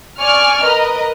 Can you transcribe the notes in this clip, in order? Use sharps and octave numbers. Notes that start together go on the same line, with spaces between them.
D5 G#5 C#6 F6
A#4 B4 D#5